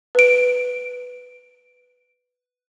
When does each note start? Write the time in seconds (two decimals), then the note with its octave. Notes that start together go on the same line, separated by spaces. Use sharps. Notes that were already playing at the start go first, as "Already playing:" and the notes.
0.15 B4 D7